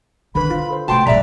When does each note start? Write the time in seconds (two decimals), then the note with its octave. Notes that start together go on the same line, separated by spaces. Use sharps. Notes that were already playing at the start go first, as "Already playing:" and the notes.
0.35 D3 D#3 C#4 B4 B5
0.50 D4 F4 C5
0.70 A4 C5
0.88 C3 A3 F#4 G5 A5 C6 D6
1.07 A#1 G2 B4 D5 E5 A#5